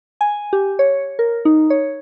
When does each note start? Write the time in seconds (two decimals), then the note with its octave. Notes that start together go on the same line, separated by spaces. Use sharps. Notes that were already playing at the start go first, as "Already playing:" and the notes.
0.21 G#5
0.53 G4
0.79 C#5
1.19 A#4
1.45 D#4
1.70 C#5